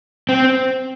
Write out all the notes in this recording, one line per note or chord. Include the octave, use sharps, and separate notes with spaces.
C4